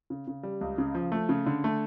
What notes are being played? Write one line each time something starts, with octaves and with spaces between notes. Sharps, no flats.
C#3
C#3
G3
C#2
C#3
F3
A3
C#3
D3
A3